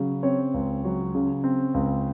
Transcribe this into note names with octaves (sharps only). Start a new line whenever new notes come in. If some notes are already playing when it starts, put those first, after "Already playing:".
Already playing: C#3 F#3
C4 C#5
C#2
F#3
C#3
C4
C#2